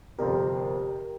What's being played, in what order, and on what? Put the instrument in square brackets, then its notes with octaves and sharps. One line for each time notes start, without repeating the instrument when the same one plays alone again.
[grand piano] G1 F2 C3 F3 C4 [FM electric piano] G4 A#4